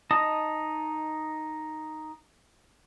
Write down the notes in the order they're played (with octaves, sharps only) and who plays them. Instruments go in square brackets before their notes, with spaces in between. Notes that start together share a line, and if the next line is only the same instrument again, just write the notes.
[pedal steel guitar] D#4 D#5 A5 D#6